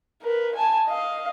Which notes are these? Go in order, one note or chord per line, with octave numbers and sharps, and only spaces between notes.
A#4 B4
G#5 A5
D#5 F5